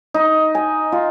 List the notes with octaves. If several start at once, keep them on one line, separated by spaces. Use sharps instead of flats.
D#4
G#5
F4